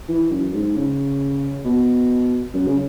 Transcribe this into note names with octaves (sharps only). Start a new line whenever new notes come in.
E3
F#2
G#2
C#3
B2
F#2
C#3